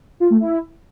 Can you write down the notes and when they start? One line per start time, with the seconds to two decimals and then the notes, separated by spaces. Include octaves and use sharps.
0.20 F4
0.30 A3
0.40 E4